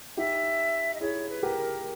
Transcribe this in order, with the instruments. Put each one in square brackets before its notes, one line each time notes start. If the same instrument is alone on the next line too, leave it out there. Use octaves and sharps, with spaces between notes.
[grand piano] D#4 G4 [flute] E5
[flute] D#5
[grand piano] E4 G#4 [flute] C#5
[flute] B4
[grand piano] G4 A#4
[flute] A#4